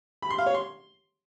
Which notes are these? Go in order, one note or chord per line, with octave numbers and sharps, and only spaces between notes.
B5
C6
F5
C#5
C6